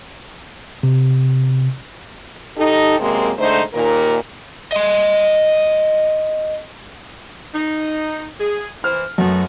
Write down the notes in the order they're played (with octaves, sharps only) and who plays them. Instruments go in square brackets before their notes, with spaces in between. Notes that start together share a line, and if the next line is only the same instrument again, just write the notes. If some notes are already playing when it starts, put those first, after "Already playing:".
[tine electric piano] C3
[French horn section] D#4 G4 A4
F#2 C3 G#3 A#3 C4
G#2 D3 A3 D#4 C5
D#2 A#2 A#4
[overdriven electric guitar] D#5 C6
[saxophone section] D#4
G#4
[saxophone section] E3 C5 [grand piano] F6
[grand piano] F#2 [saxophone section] A3 B3 F#4